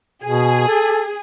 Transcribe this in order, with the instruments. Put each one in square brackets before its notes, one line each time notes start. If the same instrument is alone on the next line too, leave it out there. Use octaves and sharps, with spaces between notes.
[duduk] B2 [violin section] G#4
[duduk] A4